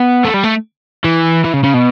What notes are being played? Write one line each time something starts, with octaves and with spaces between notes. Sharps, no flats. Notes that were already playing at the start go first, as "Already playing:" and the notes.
Already playing: B3
A3
G3
A3
E3
E3
C#3
C#3
B2